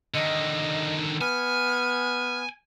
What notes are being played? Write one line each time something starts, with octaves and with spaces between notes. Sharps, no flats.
D3 D#3 D#5
B3 G#5 F6